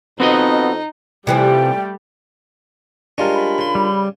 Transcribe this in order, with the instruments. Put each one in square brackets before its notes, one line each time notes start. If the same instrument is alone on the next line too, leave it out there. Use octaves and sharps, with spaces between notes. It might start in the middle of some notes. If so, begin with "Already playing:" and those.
[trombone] F2 [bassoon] B3 [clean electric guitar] C4 F#4 D#5 [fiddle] D#4
[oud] C3 E3 F3 [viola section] G3 A3 G4 [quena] G5
[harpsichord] G3 G#3 C#4 [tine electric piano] D4 F4 A#4
[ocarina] B5
[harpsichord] C#3 C6
[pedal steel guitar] G3